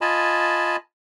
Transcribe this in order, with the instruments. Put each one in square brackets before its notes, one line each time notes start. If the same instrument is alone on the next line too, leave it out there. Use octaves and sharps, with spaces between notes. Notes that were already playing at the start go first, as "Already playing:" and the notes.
[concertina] F4 D#5 G#5 A5 B5